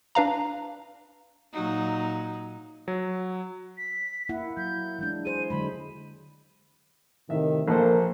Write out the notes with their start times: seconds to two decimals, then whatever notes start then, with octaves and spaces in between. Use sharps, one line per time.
0.15 D4 B4 F5 A#5
1.53 A#2 F#3 D#4
2.88 F#3
3.78 B6
4.29 A#3 E4 F#5
4.57 F#3 G6
4.99 E3 G#3 D4
5.25 G#4 C5 D#7
5.50 D3 F#3 G#3 B5
7.30 A2 C3 D#3 E5
7.68 A#1 A#3 A4 C5